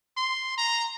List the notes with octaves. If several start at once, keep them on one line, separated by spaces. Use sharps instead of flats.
C6
A#5